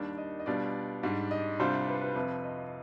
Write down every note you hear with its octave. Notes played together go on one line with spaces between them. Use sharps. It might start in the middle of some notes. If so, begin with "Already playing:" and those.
Already playing: D#2 D#3 G3 D4
D#5
D#5
B2 G3 D4 F4 D5
G#2 G3 D4
D#5
C2 C3 G3 D4 F4 C5
B4
B4
F2 C3 F3 B4
D#5